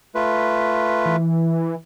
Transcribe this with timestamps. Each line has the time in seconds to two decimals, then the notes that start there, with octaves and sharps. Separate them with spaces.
0.15 A3 F4 B4
1.06 E3